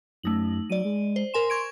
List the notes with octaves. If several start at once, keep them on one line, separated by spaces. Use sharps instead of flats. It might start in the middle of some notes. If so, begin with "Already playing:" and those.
F#2 A3 D#4 F#7
F#3 D5 D#7
G#3
C5
A#4 G#5 C6 E7
C#6 G#6 D7